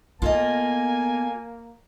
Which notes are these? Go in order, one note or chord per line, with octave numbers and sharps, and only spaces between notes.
A#3 B3 F4 A4 D#5 G#5